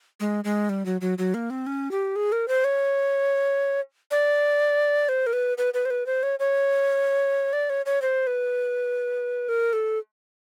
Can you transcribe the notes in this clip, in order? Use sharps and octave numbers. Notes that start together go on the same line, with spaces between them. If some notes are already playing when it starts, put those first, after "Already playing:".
G#3
G#3
G3
F#3
F#3
F#3
A#3
C4
C#4
G4
G#4
A#4
C5
C#5
D5
C5
A#4
B4
B4
B4
C5
B4
C5
C#5
C#5
D5
C#5
C#5
C5
B4
A#4
A4